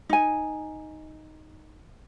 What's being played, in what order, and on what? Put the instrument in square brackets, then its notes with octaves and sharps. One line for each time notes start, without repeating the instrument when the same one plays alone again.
[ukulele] D#4 G#5